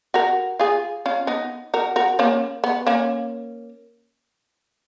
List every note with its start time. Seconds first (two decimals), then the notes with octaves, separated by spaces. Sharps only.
0.14 F#4 A#4
0.59 F4 G#4
1.06 C#4 F4
1.27 B3 D#4
1.74 F#4 A#4
1.96 F#4 A#4
2.19 A#3 C#4
2.64 B3
2.87 A#3 C#4